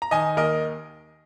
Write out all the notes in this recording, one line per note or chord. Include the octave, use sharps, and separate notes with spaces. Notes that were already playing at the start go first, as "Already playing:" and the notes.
A#5
D#3 D#5 G#5
D#2 A#4 D#5